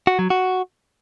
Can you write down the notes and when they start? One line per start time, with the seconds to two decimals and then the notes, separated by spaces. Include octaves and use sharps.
0.07 F#4
0.19 F#3
0.30 F#4